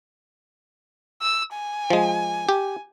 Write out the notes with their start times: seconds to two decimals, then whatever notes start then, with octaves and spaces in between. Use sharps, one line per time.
1.22 E6
1.55 G#5
1.90 F3 G#3
2.49 G4